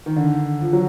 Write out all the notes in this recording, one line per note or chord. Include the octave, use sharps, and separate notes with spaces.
D#3
D3
F3
F#3